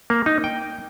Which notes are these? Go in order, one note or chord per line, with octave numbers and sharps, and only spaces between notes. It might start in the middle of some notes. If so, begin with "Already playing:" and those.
A#3
D#4
G5